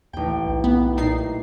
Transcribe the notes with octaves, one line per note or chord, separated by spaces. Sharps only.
A1 D#2 G5
B1
B3
A#2 D#4 C7